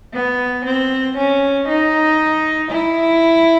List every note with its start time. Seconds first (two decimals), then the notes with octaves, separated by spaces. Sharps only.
0.13 B3
0.65 C4
1.17 C#4
1.68 D#4
2.71 E4